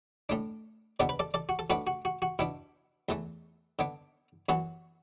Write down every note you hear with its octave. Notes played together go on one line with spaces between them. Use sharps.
A2 A3 D4
E2 B2 B3 D4 D5
B4
A4 D5
A4 D5
F#4
A4
A2 A3 D4 F#4 B4
F#4
F#4
F#4
B2 B3 D4 E4
E2 E3 A3
D3 B3 D4
F#2 E3 B3 F#4